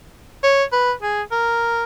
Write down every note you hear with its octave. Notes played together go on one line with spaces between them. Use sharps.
C#5
B4
G#4
A#4